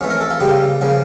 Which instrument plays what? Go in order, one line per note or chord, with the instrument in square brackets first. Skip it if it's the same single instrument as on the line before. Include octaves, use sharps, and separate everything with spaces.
[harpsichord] F2 E3 A3 C#4
A#4
A4
F4
C#3 G3 A#3 G4
C#3 F3 A#3